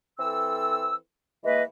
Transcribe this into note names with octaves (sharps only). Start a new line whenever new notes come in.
E3 C4 A4 E6
E3 G#3 A#3 B4 D#5 E5